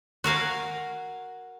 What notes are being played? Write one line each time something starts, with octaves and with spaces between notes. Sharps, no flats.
F#4 A#4 F5 G#5